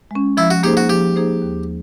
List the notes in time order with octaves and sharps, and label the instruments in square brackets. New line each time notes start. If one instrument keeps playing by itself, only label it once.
[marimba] G#3 C#4
[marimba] F3 [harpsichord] E4
[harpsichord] F#4
[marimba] A#3 D#4 G#4 C5 [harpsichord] G4
[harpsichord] F#4
[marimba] F3 [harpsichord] G4
[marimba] A#3 D#4 G#4 C5
D#2